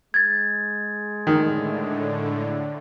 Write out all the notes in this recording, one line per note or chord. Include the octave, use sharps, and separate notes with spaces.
G#3 G#6 A6
A2 D3 D#3